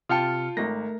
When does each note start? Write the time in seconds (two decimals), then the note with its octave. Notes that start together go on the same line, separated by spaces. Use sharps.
0.09 C3 F4 G5 A5 F6 C#7
0.57 G#1 A3 A#4 A#6